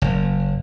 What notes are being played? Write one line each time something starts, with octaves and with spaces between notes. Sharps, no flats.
F#1